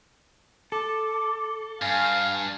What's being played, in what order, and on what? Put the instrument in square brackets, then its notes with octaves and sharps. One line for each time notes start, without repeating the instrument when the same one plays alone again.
[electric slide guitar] A4 [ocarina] D6
[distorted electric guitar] G2 [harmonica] F5 [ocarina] G#5